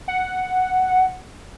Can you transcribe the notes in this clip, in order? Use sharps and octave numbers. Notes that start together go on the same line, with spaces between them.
F#5